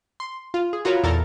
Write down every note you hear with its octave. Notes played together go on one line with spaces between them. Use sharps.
C6
F4
G#4
F4 F#4 A#4 B4 C#5
E2 A#2 A4 A#4 F6 A6